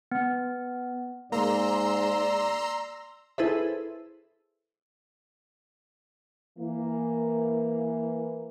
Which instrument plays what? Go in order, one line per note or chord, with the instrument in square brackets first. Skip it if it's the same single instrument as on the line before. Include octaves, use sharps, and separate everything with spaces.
[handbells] B3
[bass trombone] G#2 [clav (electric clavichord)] A#3 [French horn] D5 [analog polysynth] A#5 C6 E6
[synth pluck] E4 G#4 A4 B4 C5 E5
[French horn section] E3 A#3